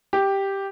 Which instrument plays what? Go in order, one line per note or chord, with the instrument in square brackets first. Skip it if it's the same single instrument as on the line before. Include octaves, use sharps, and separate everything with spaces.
[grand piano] G4